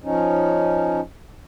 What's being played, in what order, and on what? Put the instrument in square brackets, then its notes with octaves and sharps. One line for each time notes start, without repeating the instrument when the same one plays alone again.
[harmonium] F3 C#4 D#4